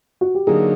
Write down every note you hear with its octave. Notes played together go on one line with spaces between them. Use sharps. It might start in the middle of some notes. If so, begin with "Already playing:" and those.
F#4
G4
D3 F#3 A#3 D#4 G#4